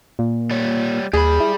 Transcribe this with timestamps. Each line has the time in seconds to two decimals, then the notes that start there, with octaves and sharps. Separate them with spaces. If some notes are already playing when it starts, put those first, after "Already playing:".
0.19 A#2
0.51 G3 C#5
1.13 D#2 G3 G#4 B5
1.40 E4